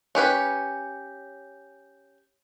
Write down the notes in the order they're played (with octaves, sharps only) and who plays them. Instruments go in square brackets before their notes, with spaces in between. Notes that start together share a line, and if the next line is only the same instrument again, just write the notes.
[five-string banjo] C#4 G4 B4 C#5